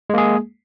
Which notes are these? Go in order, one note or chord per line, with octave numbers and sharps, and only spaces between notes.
G#3 A#3 G#4